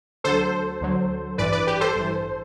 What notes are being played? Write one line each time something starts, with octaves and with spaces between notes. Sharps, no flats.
D2 D3 F#3 A4 C5
D2 D3 F#3
A1 G2 E3 B4 D5
B4 D5
G4 B4
A4 C5
A1 G2 E3